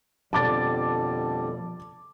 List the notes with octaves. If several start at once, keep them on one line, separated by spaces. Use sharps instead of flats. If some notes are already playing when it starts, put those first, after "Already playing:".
F2 B2 D3 F3 G3 A5 D6 A6